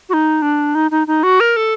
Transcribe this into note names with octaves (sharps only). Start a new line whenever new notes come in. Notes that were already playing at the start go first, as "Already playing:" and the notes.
F#4
D#4
D4
D#4
D#4
D#4
F#4
A#4
A4